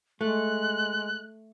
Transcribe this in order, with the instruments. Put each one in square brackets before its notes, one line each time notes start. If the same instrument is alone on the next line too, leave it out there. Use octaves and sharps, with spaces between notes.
[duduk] G#3 [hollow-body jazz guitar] A3 [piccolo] F#6